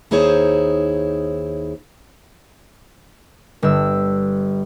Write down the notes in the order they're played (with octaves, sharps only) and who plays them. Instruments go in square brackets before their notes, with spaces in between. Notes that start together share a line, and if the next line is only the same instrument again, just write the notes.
[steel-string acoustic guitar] D#2 D#4 E4 G#4 C5 C#5
[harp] G1 E6